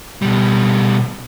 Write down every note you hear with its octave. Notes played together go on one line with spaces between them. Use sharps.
B2 G3